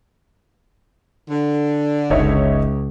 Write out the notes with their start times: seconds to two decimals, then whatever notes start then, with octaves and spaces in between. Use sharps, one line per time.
1.31 D3
2.10 F#1 C#2 D#4 C#5 E5